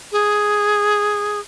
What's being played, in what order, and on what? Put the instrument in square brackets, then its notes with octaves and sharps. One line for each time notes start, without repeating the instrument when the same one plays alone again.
[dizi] G#4